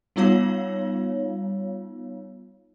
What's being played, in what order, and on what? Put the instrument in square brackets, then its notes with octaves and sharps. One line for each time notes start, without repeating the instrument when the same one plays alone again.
[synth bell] G3 B3 D#4 F4 C#5 F5